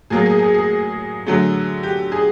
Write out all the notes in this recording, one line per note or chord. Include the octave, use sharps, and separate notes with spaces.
A2 F#3 A#3 G#4
G#4
G#4
G#4
D3 F#3 A3
G4
G#4